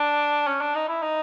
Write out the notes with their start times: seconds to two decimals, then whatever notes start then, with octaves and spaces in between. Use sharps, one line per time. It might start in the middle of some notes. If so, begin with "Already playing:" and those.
Already playing: D4
0.47 C#4
0.61 D4
0.75 D#4
0.88 E4
1.02 D#4